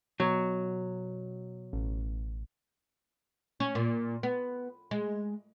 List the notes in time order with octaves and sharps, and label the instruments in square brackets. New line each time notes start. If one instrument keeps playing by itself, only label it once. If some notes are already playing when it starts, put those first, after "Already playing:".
[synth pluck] B2 [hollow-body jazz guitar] F#3
[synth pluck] A1
[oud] C#4
A#2
B3
G#3